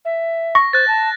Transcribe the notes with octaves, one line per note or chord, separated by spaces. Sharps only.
E5
C#6 A#6
C5 F#6 A6
A5